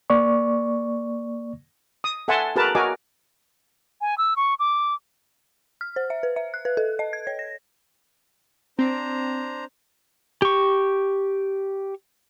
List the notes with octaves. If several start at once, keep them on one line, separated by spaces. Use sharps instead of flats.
A#3 D5 C#6
D#6
A4 E5 F#5 G#5 A5 C6
F#4 G#4 A#4 B4 A5
F#4 A#4 D#5 G#5 D6
G#5
E6
C#6
D6
F6
C5
E5
B4
E5
F#6
B4
A4
D#5
G#6
C#5
A#6
C4 D4 C5 A#5
G4 C#6